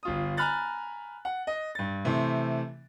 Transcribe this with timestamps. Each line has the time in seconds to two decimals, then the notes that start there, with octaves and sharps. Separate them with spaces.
0.03 G1 F4 D#6
0.37 G#5 A#5 B5 F6 F#6 A6
1.25 F#5
1.47 D#5
1.75 G2 A6
2.05 C3 E3 A3 C4